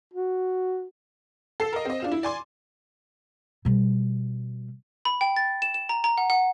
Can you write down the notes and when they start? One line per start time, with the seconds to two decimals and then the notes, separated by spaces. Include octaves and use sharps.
0.14 F#4
1.60 A4 C7
1.73 A#4 D#5
1.85 C4 D#5
2.00 D4 F4 E7
2.12 E4
2.23 D5 G#5 C6
3.65 B2 G3
5.05 B5
5.21 G5
5.36 A6
5.62 E7
5.74 E7
5.89 A#5
6.04 A#5
6.18 F#5
6.30 F#5